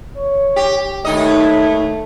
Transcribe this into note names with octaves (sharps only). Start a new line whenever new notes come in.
C#5
G4
D#2 A3 D#4 D#5